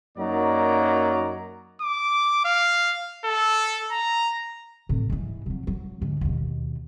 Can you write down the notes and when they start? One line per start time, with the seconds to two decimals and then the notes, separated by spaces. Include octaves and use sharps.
0.18 F#2 F#3 A#3 D#4 D5 A#5
1.82 D6
2.45 F5
3.25 A4
3.92 A#5
4.89 A2 C3
5.10 G#2 E3
5.46 C3 F#3
5.67 F#3
6.02 G#2 D3
6.21 D#2 B2